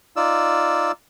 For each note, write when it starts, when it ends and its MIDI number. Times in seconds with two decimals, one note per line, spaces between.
0.16 0.92 63
0.16 0.92 65
0.16 0.92 74
0.16 0.92 88